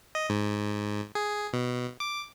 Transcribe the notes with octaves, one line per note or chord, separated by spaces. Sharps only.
D#5
G#2
G#4
B2
D6